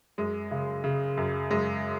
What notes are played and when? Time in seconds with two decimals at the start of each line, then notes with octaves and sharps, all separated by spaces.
0.18 F#2 G#3
0.51 C#3
0.84 C#3
1.17 F#2
1.50 F#2 G#3